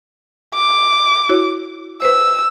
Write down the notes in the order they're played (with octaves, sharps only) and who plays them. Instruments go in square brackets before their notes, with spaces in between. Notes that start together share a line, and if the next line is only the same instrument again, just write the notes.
[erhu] D6
[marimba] E4 F#4 C#5
[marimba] B4 C5 [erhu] E6